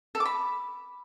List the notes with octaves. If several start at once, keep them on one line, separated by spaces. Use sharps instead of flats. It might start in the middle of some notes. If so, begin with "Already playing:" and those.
A4
D6
B5